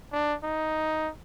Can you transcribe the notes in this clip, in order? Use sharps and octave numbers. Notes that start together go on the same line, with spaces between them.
D4
D#4